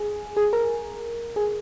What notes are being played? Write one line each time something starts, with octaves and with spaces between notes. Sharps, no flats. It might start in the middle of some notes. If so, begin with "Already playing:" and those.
Already playing: G#4
G#4
A#4
G#4